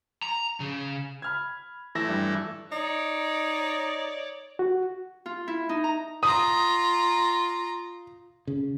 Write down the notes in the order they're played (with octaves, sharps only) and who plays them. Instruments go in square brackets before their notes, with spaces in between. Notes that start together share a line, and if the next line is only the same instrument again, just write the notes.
[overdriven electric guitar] A#5
C#3
[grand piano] B5 F6 G#6
[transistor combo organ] E3 A3 E4 [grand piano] E6 A#6
[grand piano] G2
[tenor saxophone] D#4 [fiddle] C#5 D5
[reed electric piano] F#4
[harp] F4
E4
D#4
A#5
[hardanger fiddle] F4 A#5 [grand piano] D#6
[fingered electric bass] C#3